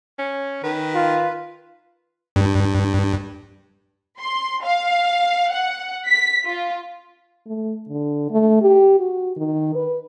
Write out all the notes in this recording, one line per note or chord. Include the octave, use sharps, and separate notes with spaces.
C#4
D#3 B4
F4
G2
C6
F5
F#5
B6
F4
A3
D3
A3
G4
F#4
D#3
B4